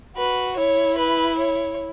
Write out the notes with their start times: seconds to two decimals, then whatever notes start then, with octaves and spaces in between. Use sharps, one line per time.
0.17 F#4 B4
0.57 E4 C#5
0.98 B4
1.39 C#5